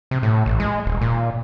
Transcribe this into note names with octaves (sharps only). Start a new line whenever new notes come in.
C3
A2
A1
G#3
D#1
A#2